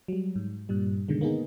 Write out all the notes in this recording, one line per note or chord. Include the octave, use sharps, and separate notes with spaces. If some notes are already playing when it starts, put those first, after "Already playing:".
F#3 G3
G#2
G2 A#2 G3
B2 D3 D#3 G#3
A#3 B3 D#4 G#4